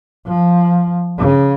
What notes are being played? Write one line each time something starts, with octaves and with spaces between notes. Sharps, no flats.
F3
C#3